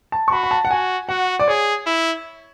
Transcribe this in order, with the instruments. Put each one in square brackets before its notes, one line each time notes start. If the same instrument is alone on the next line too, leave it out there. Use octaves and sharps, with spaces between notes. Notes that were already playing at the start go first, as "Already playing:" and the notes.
[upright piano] A5
C#6
[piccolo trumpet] F#4 [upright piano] B5
[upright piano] B5
A5
F#5
[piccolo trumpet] F#4 [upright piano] G#5
[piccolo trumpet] F#4 [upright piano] F#5
[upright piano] D5
[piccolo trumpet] G#4 [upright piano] C#5
[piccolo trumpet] E4